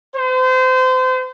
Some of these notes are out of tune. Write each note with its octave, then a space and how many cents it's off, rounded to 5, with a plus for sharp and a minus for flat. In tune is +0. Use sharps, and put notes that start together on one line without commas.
C5 -30